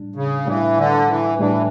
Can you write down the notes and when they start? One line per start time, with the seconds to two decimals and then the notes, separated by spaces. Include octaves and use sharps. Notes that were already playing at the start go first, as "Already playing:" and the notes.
Already playing: A2 G3 D4
0.16 C#3
0.46 A2 E3 G3 D4
0.77 D3
1.08 E3
1.38 A2 E3 G3 D4